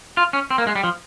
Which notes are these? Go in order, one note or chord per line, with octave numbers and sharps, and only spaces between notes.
F4
C#4
C4
A#3
G#3
G3
F3